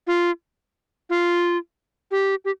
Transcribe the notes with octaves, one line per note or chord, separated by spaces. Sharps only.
F4
F4
G4
G4